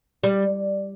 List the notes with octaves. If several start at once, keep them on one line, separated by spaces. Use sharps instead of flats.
G3